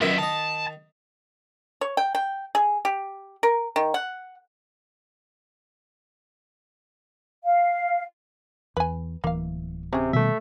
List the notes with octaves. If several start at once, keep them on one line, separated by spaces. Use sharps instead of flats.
F#2 B2 D#3 F4 E5
D#3 D#5 A5
C#5
G5
G5
G#4
G4
A#4
D#3
F#5
F5
E2 B4 G#5
D1 E3 A#3 F5
C3 C#4 G#4
B2 D#3 G3 A3 E5